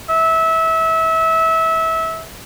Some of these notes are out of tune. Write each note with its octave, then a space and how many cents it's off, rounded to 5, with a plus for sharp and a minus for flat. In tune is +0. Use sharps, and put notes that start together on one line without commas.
E5 -25